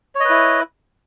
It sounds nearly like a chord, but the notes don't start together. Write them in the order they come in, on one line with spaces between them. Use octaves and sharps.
C#5 D#5 B4 E4